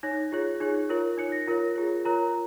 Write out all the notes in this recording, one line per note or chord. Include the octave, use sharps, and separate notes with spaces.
D#4 C#5 A#6
F4 G#4 C#5
D#4 G#4 C#5
F4 A#4 C#5
D#4 C#5 C#7
A#6
F4 A#4 C#5
F4 G#4 C#5
F4 A#4 C#5 A#5